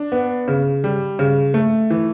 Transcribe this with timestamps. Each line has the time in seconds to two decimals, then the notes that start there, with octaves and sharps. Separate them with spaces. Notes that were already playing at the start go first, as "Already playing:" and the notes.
Already playing: D4
0.12 B3
0.48 C#3
0.84 G3
1.19 C#3
1.54 A3
1.90 E3